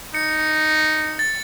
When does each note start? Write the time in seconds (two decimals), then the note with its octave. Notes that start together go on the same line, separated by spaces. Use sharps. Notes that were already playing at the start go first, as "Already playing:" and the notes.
0.14 D#4 C#7
1.19 A6